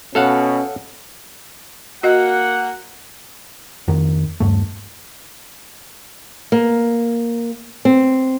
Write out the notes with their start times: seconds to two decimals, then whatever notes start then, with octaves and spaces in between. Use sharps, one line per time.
0.15 B2 C#4 A4 F5 F#5
2.03 A#3 F#4 D#5 F#5
3.88 F2 D#3
4.40 D#1 G2 A3
6.52 A#3
7.85 C4